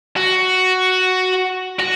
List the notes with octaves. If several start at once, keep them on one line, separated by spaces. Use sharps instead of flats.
F#4
F#4